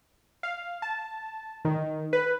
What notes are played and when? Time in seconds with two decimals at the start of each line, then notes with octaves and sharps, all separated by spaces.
0.43 F5
0.82 A5
1.65 D#3
2.13 B4